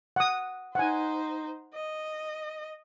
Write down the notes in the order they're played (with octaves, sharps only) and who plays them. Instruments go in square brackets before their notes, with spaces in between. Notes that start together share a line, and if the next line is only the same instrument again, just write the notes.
[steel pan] F#5 D#6
[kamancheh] D#4 C5 [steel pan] F#5 G#5
[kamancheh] D#5